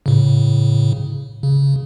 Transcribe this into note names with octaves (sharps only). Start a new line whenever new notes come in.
A2 C#3
C#3